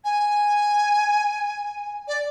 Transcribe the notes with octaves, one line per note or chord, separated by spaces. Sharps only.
G#5
D5